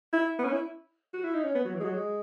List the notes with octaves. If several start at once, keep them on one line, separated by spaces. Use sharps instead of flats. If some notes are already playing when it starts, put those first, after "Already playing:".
E4
B3
C#4
E4
F#4
E4
D#4
C#4
B3
F#3
E3
G#3
F#3
G#3